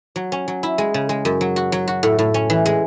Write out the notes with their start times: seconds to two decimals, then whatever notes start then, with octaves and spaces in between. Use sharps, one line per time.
0.16 F#3
0.32 C#4
0.48 F#3
0.63 E4
0.78 G#3
0.94 C#3
1.09 G#3
1.25 F#2
1.41 F#3
1.56 F#4
1.72 F#3
1.88 F#4
2.03 A2
2.19 A2
2.34 C#4
2.50 E3
2.66 G#3